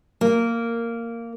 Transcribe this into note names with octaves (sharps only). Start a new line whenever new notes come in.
A#3